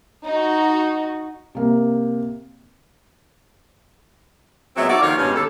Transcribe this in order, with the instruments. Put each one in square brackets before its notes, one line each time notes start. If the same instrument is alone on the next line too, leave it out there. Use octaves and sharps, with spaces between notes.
[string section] D#4 F#4
[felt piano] C3 A#3
[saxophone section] A#2 F#3 G#3 B3 C4 E5
D#4 F#4 A4 D5
D#2 D#3 F3 C#5 F5
E2 G2 B2 G#3 C#4
D#2 D3 A4